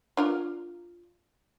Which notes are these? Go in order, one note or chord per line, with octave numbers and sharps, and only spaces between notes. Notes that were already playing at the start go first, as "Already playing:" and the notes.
D4 F4 A#4